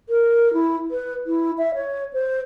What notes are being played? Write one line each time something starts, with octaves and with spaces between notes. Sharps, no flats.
A#4
E4
B4
E4
E5
C#5
C5